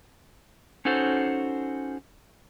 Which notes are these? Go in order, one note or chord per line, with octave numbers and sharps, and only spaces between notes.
C#4 D#4 F#4 A4 C5